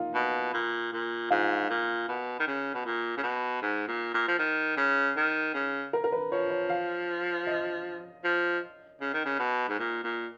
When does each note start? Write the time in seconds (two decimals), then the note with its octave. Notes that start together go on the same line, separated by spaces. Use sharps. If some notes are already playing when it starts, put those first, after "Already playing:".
Already playing: A#3 D#4 F4
0.15 B2
0.54 A#2
0.93 A#2
1.31 G#2 F4
1.70 A#2
2.08 B2
2.39 D#3
2.47 C#3
2.74 B2
2.85 A#2
3.17 C#3
3.23 B2
3.62 G#2
3.88 A#2
4.14 A#2
4.28 F3
4.39 D#3
4.77 C#3
5.16 D#3
5.54 C#3
5.93 A#4
6.04 A#4
6.12 B4
6.32 F3 C#5
6.51 C#5
6.69 F5
7.47 D#5
8.24 F3
9.01 C#3
9.13 D#3
9.25 C#3
9.39 B2
9.69 G#2
9.79 A#2
10.04 A#2